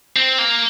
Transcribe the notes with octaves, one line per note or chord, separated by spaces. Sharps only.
C4
A#3